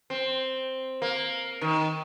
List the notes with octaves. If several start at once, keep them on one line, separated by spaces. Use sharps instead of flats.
C4
A#3
D#3